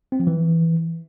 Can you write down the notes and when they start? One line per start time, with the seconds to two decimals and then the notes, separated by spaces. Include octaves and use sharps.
0.12 C4
0.20 F3
0.27 E3